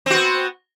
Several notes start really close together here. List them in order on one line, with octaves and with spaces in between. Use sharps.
C4 F#4 B3